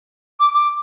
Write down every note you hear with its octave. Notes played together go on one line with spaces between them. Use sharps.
D6
D6